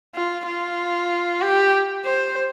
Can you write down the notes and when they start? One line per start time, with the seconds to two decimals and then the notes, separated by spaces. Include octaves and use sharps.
0.16 F4
0.47 F4
1.42 G4
2.05 C5